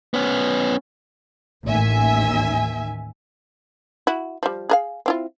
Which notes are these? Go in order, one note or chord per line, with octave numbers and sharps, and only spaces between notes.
B3 C#4
A1 D#2 D#3 E5 G#5
E4 F#4
F3 G3
G#4 A#4 F5
C4 E4 F4